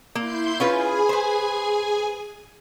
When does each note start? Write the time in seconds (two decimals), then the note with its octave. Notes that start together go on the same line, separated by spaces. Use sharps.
0.15 A#3 E4 C6 G6
0.60 C#4 F4 G#4 B4 G#5
1.09 B4 C5